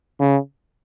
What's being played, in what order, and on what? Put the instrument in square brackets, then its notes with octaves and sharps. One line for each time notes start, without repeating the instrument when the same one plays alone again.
[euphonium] C#3